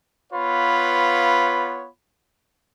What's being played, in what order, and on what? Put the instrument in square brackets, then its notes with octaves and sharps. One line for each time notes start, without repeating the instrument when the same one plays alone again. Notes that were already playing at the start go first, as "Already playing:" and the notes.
[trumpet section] B3 F4 B4 C#5 F5 B5